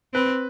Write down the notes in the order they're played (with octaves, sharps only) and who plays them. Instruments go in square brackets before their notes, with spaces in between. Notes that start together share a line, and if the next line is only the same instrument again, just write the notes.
[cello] C4 [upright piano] B4